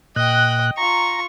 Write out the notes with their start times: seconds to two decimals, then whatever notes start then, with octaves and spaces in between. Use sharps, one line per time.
0.16 A#2 D#5 G5 F#6
0.77 F4 A#5 C#6